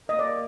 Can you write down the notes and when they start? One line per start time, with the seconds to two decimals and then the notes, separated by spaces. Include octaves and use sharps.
0.09 A#3 D#5
0.19 D5